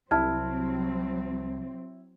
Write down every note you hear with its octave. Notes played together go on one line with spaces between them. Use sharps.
C2 F#3 C4 E4 A5 F6 G#6